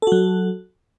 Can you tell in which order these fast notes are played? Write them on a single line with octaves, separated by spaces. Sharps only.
A4 F#4 F#3